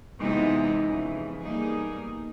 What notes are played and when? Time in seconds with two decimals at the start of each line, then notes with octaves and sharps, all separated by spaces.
0.18 C3 E3 G#3 B3 D#4
0.81 F2 C#3 E3
1.42 B2 G3 A#3 D#4 G#4